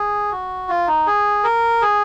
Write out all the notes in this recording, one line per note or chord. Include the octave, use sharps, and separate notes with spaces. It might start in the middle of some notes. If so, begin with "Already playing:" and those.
Already playing: G#4
F#4
F4
D#4
G#4
A#4
G#4